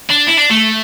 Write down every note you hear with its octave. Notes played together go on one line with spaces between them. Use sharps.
D4
E4
D4
A3